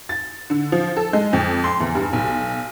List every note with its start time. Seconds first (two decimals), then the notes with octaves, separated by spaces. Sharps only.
0.09 A6
0.50 D3
0.72 F3
0.96 A4
1.13 G#3
1.33 F2
1.64 C6
1.80 E2
1.95 G2
2.13 B1